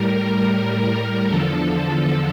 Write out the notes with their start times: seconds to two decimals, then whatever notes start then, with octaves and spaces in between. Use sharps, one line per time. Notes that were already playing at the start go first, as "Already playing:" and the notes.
Already playing: A2 G3 A#4
0.13 A#4
1.27 E2 D3 F3 A4
1.66 A4